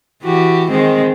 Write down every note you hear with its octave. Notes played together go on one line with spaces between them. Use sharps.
E3 F#4 G4
D#3 G#3 C4